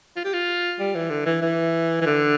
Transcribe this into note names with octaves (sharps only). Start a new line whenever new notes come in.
F4
G4
F4
G3
E3
D3
E3
E3
E3
D3